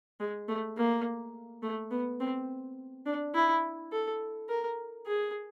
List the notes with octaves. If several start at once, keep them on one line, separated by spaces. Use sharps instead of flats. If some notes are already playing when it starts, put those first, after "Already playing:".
G#3
A3
A#3
A3
B3
C4
D4
E4
A4
A#4
G#4